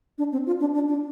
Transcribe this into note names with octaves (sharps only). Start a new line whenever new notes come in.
D4
C4
F4
D4
D4
D4